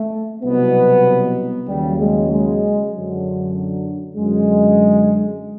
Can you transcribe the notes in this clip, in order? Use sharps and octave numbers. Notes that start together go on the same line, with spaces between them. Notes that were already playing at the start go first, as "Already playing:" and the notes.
Already playing: A3
C2 B2 F#3 B3
D#2 C#3 F#3 G3
G#3
G#3
F#2 D3 F#3
F#2 D3 F#3 G#3